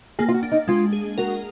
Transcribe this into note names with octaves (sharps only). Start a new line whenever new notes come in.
A#3 G#4
F4
F#4
D4
D#4
G#3 F4
G#4
F#4 A#4